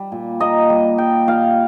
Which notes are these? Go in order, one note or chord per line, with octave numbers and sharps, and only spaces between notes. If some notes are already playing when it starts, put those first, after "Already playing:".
Already playing: G3
A#2
A#3 D#5
G3
G3 G5
A#2 F5